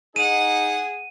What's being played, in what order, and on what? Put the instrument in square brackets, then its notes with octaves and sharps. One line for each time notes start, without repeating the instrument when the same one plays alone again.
[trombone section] D#4 [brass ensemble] G#4 [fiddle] F#5 [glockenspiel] D#7